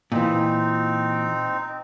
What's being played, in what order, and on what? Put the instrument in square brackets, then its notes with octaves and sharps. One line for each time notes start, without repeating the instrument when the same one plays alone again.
[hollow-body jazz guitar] A#2 E3 [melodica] C4 D#4